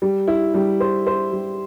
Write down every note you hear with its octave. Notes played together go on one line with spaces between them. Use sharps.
G3
E4
G3
C5
C5
G3